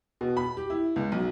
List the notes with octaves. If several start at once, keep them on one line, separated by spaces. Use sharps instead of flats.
B2
B5
G4
E4
C#2
B1